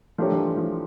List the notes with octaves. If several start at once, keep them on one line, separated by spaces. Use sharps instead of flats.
F3 A3 D4 G4 A#4 C#5
F3
E3
F3